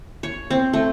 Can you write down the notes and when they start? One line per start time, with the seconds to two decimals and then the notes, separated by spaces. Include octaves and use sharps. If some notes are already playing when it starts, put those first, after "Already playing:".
0.23 C#5
0.50 C4
0.73 A3